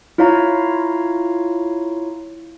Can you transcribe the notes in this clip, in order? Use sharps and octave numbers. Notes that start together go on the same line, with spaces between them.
E4 F4 C#5 F5 A#5